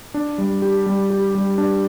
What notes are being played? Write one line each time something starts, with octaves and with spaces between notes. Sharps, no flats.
D4
G3
G4
G3
G4
G3
D4